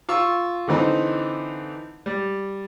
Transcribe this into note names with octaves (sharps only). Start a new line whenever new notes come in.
F4 C#6 E6
D3 E3 C4 D#4
G3